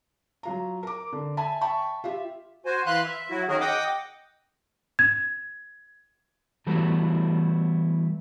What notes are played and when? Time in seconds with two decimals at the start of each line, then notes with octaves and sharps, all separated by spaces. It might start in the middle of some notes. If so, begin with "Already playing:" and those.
0.43 F#3 F4 A#5
0.83 A#4 D6
1.13 D3
1.37 E5 G#5 A5 B5
1.61 E5 G5 A5 B5 C#6
2.04 F4 G4 E5
2.66 F#4 C5 G#5
2.86 E3 B4 F5 C6 F#6
3.05 E5
3.30 F#3 E4 F#4
3.48 D#3 C#4 F#4 G#4 A#4
3.61 D#5 F#5 G5 D6 D#6
4.99 G#6
6.67 E3 G3 A3 B3 E4 F#4